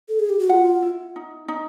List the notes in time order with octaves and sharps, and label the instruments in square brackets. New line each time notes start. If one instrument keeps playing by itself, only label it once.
[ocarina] A4
G#4
G4
F#4
[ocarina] F4 [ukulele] F#5
[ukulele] E4
D#4
D#4